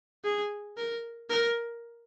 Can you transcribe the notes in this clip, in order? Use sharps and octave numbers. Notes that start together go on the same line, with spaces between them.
G#4
A#4
A#4